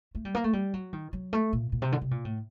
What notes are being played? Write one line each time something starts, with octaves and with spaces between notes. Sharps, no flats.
A3
G3
A#3
A3
G3
F#3
D#3
F#3
A3
A#2
A#2
C3
D3
C3
A#2
A2